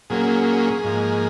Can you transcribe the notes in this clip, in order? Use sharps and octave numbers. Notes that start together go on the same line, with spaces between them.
A#2 F#3 A#3 C#4 G#4
G#2 F3 A#3